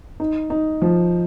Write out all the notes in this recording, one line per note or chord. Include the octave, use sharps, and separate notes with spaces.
D#4
D#4
F3